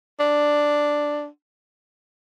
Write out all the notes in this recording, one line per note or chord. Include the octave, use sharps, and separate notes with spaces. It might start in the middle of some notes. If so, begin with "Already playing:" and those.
D4